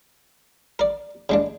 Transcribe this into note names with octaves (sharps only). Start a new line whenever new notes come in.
A#4 D5
C#3 G#3 D4